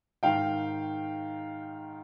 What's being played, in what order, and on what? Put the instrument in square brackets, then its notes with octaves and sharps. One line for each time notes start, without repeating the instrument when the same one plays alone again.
[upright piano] G#2 D#3 F5 G5